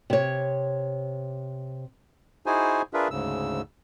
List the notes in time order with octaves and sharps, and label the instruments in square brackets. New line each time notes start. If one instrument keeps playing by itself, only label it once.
[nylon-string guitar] C3 C#5
[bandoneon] D#4 E4 F#4 G#4 C5 G#5
D4 F4 G#4 A#4 B4 E5
D2 G#2 C#3 E6